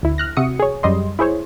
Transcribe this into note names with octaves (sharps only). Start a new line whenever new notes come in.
D2 E4
F6 F#6 A#6
C3 F#4 E5 D#6 C#7
G#4 C#5
F#2 G3 D#5 C6
E4 G#4 C5 C#5